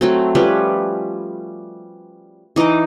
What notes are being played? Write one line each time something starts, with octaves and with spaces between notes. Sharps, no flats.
F#3 A3 C4
F3 G3 C#4 B4
E3 D#4 D#5 D6